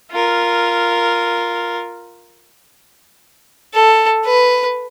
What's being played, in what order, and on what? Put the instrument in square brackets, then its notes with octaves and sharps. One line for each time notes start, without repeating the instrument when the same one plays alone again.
[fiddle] F4 A#4
A4
B4